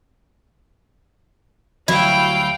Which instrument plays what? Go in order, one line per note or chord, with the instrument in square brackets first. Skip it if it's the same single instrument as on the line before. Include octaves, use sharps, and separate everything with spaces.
[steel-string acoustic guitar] D2 F#3 G3 [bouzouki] E4 [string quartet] F5 G5